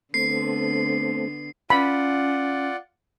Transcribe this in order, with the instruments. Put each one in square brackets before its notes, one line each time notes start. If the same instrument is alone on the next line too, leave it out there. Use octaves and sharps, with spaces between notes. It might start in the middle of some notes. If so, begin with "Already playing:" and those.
[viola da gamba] D3 B3 [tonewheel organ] A3 C4 [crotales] C7
[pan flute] C#4 [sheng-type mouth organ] F4 D5 F#5 [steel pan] B5